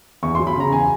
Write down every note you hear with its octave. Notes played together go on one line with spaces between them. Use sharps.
E2 C#6
C6
F#3
B5
C#3 A#5
E2 G#5